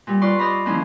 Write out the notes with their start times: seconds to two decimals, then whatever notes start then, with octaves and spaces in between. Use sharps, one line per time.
0.07 A#2 G3
0.21 F4 B4 D5 C6 C#6
0.39 C5 D5 D#5 A#5 B5
0.66 D#2 F3 A#3 C#4 E4